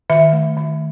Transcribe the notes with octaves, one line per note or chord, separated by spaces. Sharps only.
D#3 E5
A3
D#3